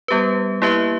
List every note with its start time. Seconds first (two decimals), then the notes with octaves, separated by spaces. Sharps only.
0.08 G3 B3 G4 B4
0.62 A#3 E4 G4 B4 E5